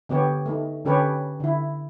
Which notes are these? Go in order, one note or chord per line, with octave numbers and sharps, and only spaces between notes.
D3 B3 G4 C#5
A3 D#4
D3 C#4 G4 A4 B4 C#5
D3 E4